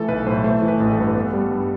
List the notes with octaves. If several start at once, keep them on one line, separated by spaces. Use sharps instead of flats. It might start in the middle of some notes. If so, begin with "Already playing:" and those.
Already playing: E3 A3 A4
B1 B4
A2 C5
A3 C5
E3
B4
A1
A4
G2
B3
G3
G2